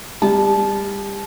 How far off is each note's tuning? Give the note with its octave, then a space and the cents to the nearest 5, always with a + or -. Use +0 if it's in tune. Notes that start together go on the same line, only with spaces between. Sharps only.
G3 +30 A5 -25